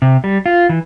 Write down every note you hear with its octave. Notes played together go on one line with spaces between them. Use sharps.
C3
G3
F4
E3